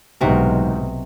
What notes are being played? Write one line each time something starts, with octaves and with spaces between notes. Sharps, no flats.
D1 B1 G#2 C3 D#4 F#4 A#4